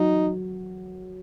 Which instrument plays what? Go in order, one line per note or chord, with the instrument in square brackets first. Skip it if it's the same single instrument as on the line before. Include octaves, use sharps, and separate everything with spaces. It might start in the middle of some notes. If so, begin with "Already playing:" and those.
Already playing: [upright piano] F#3 [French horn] D#4